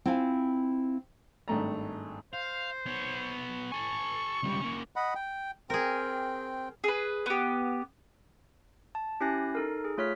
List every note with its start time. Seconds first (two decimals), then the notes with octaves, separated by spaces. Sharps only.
0.06 C4 E4 F4 F5 G5 G#5
1.48 G#1 G2 A3 A#5
2.33 C5 F5
2.86 B3 C#5
3.72 A4 G#5 C#6
4.43 C#2 G3
4.61 A#3 C#4
4.96 D#5 F#5 B5
5.15 G5
5.70 C4 G#4 A#4 G5
6.84 G#4 B4
7.26 B3 G4
8.95 A5
9.21 C#4 E4 G4 G#5 F#6 A#6
9.55 D#4 A4 A#4
9.84 G#4
9.98 A3 F4 C#5 F6 B6